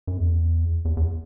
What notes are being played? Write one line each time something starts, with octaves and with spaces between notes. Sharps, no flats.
F#2
E2
E2
E2